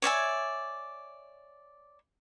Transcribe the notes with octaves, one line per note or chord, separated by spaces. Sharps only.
C#5 D5 E5 G#5